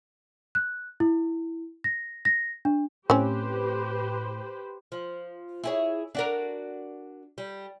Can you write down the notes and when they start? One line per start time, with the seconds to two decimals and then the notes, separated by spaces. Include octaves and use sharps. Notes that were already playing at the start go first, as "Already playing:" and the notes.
0.55 F#6
1.00 E4
1.84 A#6
2.25 A#6
2.65 D4
3.10 A2 C4 C#4 G4 B4 C5
4.92 F3
5.64 E4 G#4 C#5
6.15 D4 F#4 A#4
7.38 G3